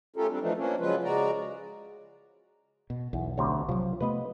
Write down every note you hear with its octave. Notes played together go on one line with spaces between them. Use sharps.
A3 C#4 F4 G4 A4 A#4
G3 C4 D4
E3 F3 A3 D4 D#4
F3 A#3 C#4 D4
C#3 F3 F#3 G#3 F4 B4
C#3 G#3 F#4 D5 A#5
B2
B1 E2
D2 C3 C#5
C3 F3 F#3
C3 A3 B3 B4 D#5